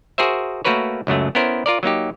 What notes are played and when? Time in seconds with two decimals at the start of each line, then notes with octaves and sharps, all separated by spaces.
0.18 F#4 G#4 A#4 C5 E5
0.65 A3 A#3 F#4 A#4 B4 C#5
1.07 C#2 F#2 F#3 A3
1.35 B3 C#4 E4 A#4 C5
1.66 F4 A#4 D5
1.83 F#3 A#3 D#4 G4